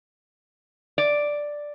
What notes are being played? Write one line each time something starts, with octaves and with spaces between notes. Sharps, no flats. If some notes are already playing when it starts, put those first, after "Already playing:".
D5